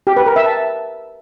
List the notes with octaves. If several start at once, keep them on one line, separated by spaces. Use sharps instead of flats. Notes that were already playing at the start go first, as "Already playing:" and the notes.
G4
B4
A#4
E5
A5